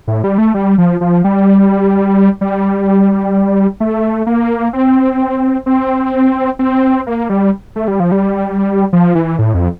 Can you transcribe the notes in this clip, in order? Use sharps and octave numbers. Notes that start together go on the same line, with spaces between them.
A2
G3
A3
G3
F3
F3
G3
G3
A3
A#3
C4
C4
C4
A#3
G3
A3
G3
F3
G3
F3
E3
A2
F2